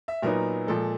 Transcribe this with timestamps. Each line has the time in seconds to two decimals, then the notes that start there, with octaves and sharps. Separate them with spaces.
0.08 E5
0.22 A#2 F#3 B3 D#4 A#4
0.67 A#2 F3 G#3 A4